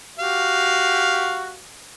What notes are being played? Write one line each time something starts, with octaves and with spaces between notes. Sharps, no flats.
F#4 G4 F5